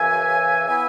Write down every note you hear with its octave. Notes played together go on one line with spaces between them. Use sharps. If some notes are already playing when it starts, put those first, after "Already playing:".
Already playing: F#2 C#3 E3 E5 G#5
E3 B3 E4 E5 G#5